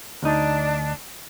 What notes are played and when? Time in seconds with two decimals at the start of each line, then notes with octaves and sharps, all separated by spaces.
0.22 D2 D4 D#4